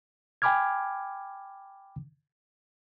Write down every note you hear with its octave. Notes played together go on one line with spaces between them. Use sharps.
G5 G#5 B5 D6 F6 G#6